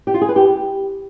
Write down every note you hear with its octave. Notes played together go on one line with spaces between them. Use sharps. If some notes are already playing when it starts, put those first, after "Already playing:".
G4
F4
G#4
B4
G4